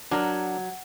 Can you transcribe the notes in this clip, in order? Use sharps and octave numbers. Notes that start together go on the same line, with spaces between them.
F#3 D4 A#4